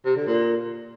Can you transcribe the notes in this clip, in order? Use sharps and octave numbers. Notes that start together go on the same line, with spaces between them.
C3
D3
A#2